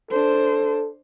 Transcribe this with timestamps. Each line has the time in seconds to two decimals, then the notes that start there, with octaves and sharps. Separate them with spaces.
0.11 D4 A4 C5